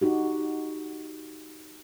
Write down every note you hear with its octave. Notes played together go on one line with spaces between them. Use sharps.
D#4 F#4 G4